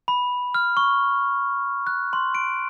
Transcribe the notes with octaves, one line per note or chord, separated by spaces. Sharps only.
B5
F6
C#6
F#6
C6
D7